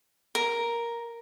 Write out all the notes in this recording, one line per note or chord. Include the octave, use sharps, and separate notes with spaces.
A#4